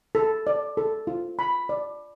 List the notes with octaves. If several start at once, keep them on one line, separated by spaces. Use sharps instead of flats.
A4
D5
A4
F4
B5
D5